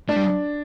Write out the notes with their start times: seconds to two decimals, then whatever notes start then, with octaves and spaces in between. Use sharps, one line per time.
0.09 A3 D4
0.16 G3